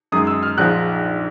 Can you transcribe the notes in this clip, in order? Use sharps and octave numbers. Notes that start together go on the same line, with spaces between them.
F#2 D#3 G#3 D#6
E6
F6
A#1 G#2 F3 G#3 F#6